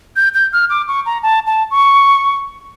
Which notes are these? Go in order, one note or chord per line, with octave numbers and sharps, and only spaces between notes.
G6
G6
F6
D6
C#6
A#5
A5
A5
C#6